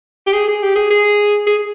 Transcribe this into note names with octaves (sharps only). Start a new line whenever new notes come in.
G4
G#4
G#4
G4
G#4
G#4
G#4